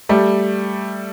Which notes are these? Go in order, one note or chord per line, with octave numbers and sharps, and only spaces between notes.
G3 A3